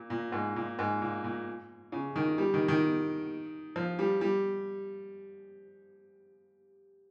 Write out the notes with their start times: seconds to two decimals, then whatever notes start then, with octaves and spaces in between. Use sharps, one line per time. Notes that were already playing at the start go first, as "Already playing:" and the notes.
Already playing: A#2
0.10 A#2
0.32 G#2
0.56 A#2
0.79 G#2
1.01 A#2
1.24 A#2
1.92 C#3
2.16 D#3
2.38 G3
2.54 D#3
2.68 D#3
3.76 F3
3.99 G3
4.21 G3